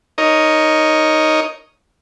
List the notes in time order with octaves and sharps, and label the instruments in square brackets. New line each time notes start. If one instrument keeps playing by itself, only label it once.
[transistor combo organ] D#4 A#4 C#5 D#5